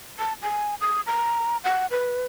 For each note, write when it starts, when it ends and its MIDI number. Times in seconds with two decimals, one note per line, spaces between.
0.19 0.33 81
0.42 0.75 80
0.81 1.01 87
1.06 1.57 82
1.64 1.86 78
1.91 2.26 71